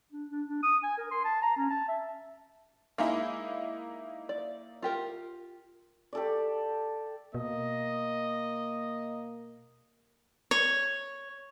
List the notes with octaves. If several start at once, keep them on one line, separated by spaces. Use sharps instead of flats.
D4
D4
D4
D#6
G#5
A#4
C6
A5
A#5
C#4
A5
E5
G#3 A#3 D#4 E4 G#4
D5
F4 G4 A#4
G4 A4 D5
B2 A#3 D#5
C#5